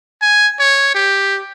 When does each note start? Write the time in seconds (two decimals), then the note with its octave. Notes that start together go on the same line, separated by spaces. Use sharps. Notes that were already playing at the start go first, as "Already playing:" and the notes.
0.22 G#5
0.60 C#5
0.94 G4